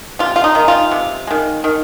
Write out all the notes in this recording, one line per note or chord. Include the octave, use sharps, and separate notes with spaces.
C3 F4
F4
D#4
D#3 G#3
F4
C3
D#3 G#3
D#3